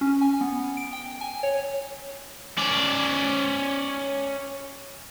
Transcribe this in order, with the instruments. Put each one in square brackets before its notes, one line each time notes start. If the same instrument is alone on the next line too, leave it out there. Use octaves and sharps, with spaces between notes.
[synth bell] C#4
G#5
B3
D7
G5
G#5
C#5
[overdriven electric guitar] C#4 D5